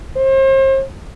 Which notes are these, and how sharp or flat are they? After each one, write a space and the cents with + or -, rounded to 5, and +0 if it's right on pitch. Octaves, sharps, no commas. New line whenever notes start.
C5 +40